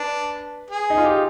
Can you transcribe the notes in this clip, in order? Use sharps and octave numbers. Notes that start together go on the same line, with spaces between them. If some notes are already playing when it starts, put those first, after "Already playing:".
Already playing: D4 B4
G#4
D#4
F4
G4
G#4